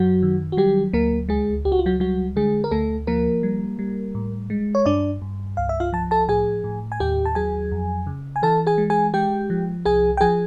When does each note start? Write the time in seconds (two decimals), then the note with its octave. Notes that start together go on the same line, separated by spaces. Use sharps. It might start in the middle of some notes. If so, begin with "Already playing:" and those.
Already playing: F#2 F#3 F#4
0.23 D#3
0.52 F#4
0.57 F#3 G3 G4
0.93 D2 A#3 A#4
1.29 C#2 G#3 G#4
1.65 C#2 G4
1.72 F#4
1.79 F4
1.86 F#3 F#4
2.00 F#3 G3 F#4
2.36 D3 G#3 G#4
2.64 A#4
2.71 D2 A3 A4
3.07 F3 A#3 A#4
3.43 G3
3.79 G3
4.15 A2
4.50 G#3
4.75 C#5
4.86 G2 D4 D5
5.22 G2
5.57 C2 F5
5.69 E5
5.80 F4 F5
5.92 F3 A5
6.11 A4 A5
6.28 A2 G#4 G#5
6.64 A2
6.92 G#5
7.00 D#2 G4 G5
7.25 A5
7.35 F#3 G#4 G#5
7.72 F2
8.07 C#3
8.36 G#5
8.42 E3 A4 A5
8.67 G#4 G#5
8.78 G#3
8.90 G#4 G#5
9.14 G#3 G4 G5
9.50 F3
9.85 C2 G#4 G#5
10.17 G5
10.21 F3 G#4 G#5